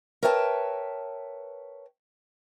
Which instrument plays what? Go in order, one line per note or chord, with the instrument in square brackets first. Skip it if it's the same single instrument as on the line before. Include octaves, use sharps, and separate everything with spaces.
[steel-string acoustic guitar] A#4 B4 C#5 E5 G5 A5